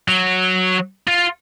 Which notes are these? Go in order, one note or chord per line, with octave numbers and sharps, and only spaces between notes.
F#3
F4